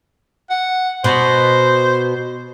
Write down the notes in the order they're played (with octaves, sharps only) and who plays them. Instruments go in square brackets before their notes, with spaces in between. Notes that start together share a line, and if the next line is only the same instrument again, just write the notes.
[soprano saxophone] F#5
[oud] B2 [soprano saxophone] C5